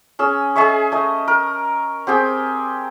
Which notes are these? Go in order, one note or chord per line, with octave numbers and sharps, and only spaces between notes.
C#4 G#4 E6
G#4 D#5 E5 C#6
A3 D#5
A#4
C4 G4 G#4 G5